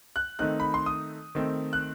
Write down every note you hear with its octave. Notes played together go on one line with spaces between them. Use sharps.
F#6
D#3 A3 C4 D#4 F#6
B5
C6
D#6
D#3 A3 C4
F#6